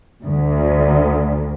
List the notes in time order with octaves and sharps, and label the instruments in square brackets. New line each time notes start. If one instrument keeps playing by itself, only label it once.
[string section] D2